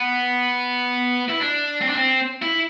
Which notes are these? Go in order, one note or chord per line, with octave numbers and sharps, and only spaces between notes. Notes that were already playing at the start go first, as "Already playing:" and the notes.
Already playing: B3
E4
D4
C4
D4
C4
E4